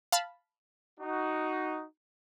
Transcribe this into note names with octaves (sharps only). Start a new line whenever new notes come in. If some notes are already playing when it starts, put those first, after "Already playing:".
F5 A5 B5
D#4 F#4